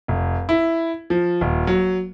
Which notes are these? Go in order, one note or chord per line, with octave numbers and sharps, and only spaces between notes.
F1
E4
F3
D#1
F#3